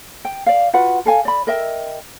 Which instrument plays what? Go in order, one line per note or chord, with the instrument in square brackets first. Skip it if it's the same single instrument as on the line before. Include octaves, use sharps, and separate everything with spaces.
[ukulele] G5
D5 F5
F4 F#4 B4 F#5
A4 F5 G#5
D5 B5
A#4 D#5 E5 G5